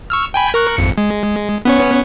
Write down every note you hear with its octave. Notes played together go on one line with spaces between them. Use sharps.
C#6 E6 F6
G5 G#5 B5
A#4 C#6 F#6
G#1 F2 C#7
G#3
B3 C#4 C#5